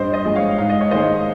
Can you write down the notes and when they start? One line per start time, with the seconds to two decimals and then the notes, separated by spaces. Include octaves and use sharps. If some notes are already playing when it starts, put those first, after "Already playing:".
Already playing: G2 C5 D#5
0.12 C5 D#5
0.24 F3 G#3
0.36 C#5 F5
0.58 G#2 F5
0.69 D#5
0.81 C#5
0.91 D#3 G#3 C5 D#5